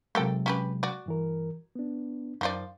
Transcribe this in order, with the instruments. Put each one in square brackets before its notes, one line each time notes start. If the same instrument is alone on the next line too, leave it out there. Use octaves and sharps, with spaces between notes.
[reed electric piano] C3 F#3 G#3 [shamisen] A#3 A4 G5
[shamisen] C#4 G4 B4
F#4 D5
[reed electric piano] G2 E3 A#4
B3 D4
[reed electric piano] F#2 [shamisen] D#3 F3 D5